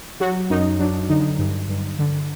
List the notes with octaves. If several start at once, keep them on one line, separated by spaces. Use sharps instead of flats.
F#3 F#4
F#2 D#4
F#3 D4
D3 D#4
G2
G2
D3